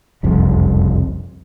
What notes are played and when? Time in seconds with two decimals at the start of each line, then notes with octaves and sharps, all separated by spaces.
0.23 F#1 C2 F2